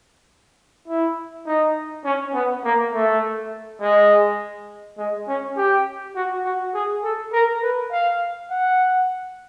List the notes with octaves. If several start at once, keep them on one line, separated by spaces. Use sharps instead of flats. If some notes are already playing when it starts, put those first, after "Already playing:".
E4
D#4
C#4
B3
A#3
A3
G#3
G#3
C#4
G4
F#4
F#4
G#4
A4
A#4
B4
F5
F#5